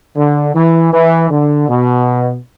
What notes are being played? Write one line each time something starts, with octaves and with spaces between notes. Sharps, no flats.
D3
E3
E3
D3
B2